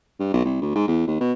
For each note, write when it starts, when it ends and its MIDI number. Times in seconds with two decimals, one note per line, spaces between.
0.20 0.30 43
0.33 0.44 35
0.45 0.58 36
0.62 0.72 38
0.75 0.84 44
0.88 1.07 40
1.07 1.17 39
1.20 1.32 47